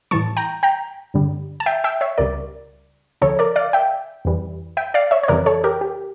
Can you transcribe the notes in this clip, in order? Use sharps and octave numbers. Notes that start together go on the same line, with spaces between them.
A2 E3 G3 A5 C#6
G5 A#5
G5 A#5
G2 D3 G3
A5
E5 G5
E5 G5
C#5 E5
C#2 C#3 G3 A#4 D5
D2 C#3 F3 A4 C#5
A#4 D5
D5 F5
E5 G5
F2 E3 G3
E5 G5
D5 F5
C#5 E5
C#5
F2 C#3 E3 G3 A#4 D5
A4 C#5
G4 A#4
G4